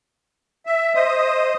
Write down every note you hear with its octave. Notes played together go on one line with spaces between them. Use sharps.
E5
C5 D#5 D#6